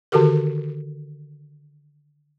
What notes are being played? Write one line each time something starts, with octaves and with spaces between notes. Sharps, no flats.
D3 D#3 F#4 G4 A4 A#4